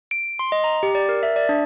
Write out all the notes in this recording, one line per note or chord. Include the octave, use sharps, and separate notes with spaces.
D7
C6
D#5
A#5
G4
D5
A#4
E5
D5
D4